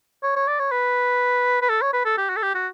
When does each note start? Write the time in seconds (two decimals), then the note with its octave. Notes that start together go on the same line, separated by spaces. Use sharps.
0.23 C#5
0.36 C#5
0.48 D5
0.59 C#5
0.71 B4
1.62 B4
1.69 A4
1.82 C#5
1.93 B4
2.05 A4
2.17 G4
2.29 F#4
2.36 A4
2.42 G4
2.54 F#4